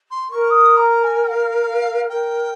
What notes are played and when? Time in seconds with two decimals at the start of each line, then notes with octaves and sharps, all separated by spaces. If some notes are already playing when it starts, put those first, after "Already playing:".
0.10 C6
0.30 A#4 C#6
0.50 D#6
0.76 A#5
1.03 G#5
1.30 F5
2.08 A#4 G5